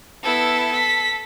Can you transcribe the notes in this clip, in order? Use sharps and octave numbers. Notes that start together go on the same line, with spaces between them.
B3 E4 A4
B6